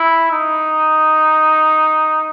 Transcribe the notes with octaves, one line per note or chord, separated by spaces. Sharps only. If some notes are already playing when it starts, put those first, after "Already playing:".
Already playing: E4
D#4